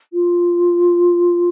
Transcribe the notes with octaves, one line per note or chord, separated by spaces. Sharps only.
F4